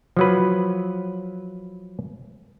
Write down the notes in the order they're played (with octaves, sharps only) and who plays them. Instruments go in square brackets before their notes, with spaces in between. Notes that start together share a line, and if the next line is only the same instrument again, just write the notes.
[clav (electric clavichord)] F3 F#3 B4